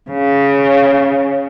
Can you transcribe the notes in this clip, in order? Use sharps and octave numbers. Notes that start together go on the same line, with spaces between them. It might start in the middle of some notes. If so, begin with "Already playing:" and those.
C#3